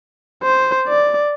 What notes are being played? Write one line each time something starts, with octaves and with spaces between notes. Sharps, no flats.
C5
D5